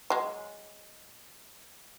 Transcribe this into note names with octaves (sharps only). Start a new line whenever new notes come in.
F#3 G#3